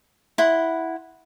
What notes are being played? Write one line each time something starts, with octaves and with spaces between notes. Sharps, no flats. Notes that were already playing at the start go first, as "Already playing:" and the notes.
E4 F#5 C6